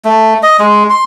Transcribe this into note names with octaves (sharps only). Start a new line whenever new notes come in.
A3
D#5
G#3
C6